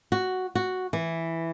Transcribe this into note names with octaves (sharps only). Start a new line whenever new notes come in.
F#4
F#4
E3